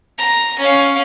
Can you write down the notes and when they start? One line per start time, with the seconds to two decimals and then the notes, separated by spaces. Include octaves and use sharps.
0.18 A#5
0.59 C#4 F5